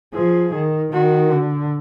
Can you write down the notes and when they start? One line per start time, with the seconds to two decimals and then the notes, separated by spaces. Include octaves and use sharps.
0.14 F3 G#4
0.54 D#3
0.93 D#3 F#4
1.32 D3